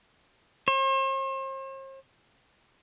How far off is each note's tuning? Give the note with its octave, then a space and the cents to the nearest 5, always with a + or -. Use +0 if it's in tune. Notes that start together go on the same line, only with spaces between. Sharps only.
C5 +45